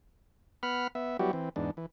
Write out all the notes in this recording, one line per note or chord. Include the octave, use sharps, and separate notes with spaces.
B3 F#5 B5 F6
B3 E5
F#3 G3 B3 E4 F#4 G4
E3 C4
E2 G#2 D4
E3